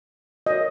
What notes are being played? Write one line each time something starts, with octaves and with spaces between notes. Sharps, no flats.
F#4 A#4 C#5 D#5